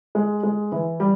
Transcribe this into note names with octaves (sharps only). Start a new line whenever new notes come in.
G#3
G#3
E3
G3